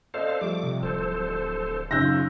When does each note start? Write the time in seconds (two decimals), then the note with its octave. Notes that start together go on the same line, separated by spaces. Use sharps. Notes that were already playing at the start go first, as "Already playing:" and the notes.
0.14 A4 C5 D5 D#5 F5
0.41 F3 G3 A3 D6
0.63 C3
0.83 D1 A4 C5
1.91 F#2 C#3 D#4 F4 E6 F#6 G6 A#6